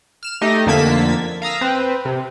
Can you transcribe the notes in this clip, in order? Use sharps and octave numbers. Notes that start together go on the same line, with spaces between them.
F6 E7
A3 D#4 G4 D#5
F2 D3 A#3 A5 G#6 B6
F5 A#5 D#6 E6
C4 B4
C3